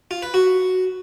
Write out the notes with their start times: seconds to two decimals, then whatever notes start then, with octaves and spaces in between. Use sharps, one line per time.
0.11 F4
0.22 B4
0.34 F#4